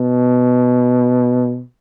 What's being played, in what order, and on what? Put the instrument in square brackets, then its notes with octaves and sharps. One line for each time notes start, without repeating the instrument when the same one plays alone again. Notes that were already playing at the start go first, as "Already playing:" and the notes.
Already playing: [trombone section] B2